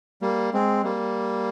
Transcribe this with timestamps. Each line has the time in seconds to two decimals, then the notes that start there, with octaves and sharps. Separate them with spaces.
0.22 G3 A#3
0.53 G#3 C4
0.84 G3 A#3